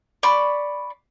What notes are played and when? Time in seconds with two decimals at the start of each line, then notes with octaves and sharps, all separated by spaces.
0.23 D5 B5 C#6